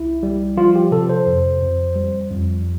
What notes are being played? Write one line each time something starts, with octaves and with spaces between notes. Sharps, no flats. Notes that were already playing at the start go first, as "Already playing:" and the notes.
Already playing: C2 E4
G3
F3 F4
G4
C3 A4
C5
F2
F2
G3
F2